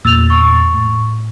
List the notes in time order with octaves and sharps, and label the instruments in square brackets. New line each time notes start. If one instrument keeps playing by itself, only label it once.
[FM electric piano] E2 A#2 A6 [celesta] E6 F7
[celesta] C#6
[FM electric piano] A2